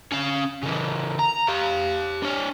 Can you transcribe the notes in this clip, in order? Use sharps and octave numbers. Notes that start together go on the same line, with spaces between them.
C#4 F5
C#3 E3
A#5
G4 F5
D4 C#5